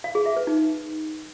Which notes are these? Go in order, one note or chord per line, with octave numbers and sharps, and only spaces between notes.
F5
G#4
E5
B4
D#4